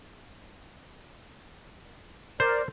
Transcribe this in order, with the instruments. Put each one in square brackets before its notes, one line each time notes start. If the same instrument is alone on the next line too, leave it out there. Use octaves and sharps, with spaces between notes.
[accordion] A#4 D5 [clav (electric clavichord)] C5